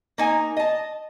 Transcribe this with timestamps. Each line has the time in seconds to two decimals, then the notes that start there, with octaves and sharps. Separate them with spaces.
0.18 A#3 D#4 G#5
0.57 D#5 A5